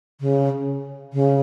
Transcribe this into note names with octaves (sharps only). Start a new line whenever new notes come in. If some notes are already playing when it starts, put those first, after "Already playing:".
C#3
C#3